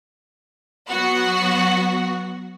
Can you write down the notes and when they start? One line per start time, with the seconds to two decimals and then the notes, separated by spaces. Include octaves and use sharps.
0.89 F#3 B3 F#4 F#5